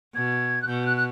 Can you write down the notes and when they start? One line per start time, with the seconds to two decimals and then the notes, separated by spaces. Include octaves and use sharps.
0.15 B2 G#6
0.62 F#6
0.67 B2 G6
0.86 F#6
0.97 F#6